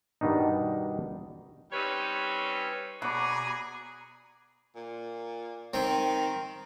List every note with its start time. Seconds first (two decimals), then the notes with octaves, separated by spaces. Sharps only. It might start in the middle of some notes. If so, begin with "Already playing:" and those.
0.21 G2 B2 D#3 D4 D#4
1.72 G3 C4 C#4 D#4 B4 C#5
3.02 B2 G#4 D5 F#5 A#5 B5 D6
4.76 A#2
5.74 D#3 C4